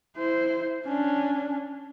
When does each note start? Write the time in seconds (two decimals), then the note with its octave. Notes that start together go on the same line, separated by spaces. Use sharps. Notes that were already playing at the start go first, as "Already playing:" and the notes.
0.16 E4 C5
0.86 C#4 D4